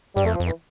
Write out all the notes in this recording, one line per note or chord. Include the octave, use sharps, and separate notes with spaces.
G2 G3
F2 A3
F3
F2
E3